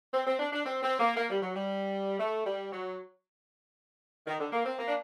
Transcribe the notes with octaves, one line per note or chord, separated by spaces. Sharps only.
C4
C4
D4
D4
C4
C4
A#3
A#3
G3
F#3
G3
A3
G3
F#3
D#3
D3
A#3
C4
A#3
D4